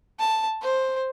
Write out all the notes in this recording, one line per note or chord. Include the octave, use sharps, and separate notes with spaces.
A5
C5